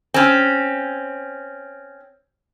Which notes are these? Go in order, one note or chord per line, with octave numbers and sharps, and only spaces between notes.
C4 C#4